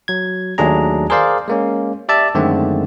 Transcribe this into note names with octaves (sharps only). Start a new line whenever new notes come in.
F#3 G#6
D#2 F#3 A3 D4 G#4 A#5
G#4 A#4 C5 D5 F5
G#3 A#3 C#4
G4 D5 E5 A5
F#2 D3 D#3 G#3 A3 C4